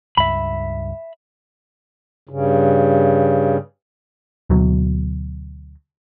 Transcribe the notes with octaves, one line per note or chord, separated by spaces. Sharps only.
C#2 G2 E5 B5
G2 C#3
D2 B2 F#3